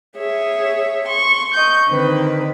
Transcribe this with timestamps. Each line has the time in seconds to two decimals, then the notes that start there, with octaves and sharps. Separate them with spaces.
0.17 G#4 C#5 E5
1.06 C6 C#6
1.54 D#5 C#6 G6
1.89 D3 D#3 C4 B4